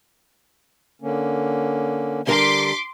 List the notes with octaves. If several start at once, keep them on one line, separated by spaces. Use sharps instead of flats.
D3 A#3 C#4
D3 G3 A#4 C6 D6 B6